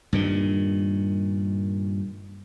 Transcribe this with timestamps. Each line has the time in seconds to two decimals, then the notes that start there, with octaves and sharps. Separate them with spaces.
0.13 G2 A#2 D#3